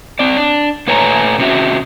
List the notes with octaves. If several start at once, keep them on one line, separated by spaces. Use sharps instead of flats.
C4 D5
D4
A#2 A3 B4 C#5 G#5 A#5
C3 C#4 F#4 E5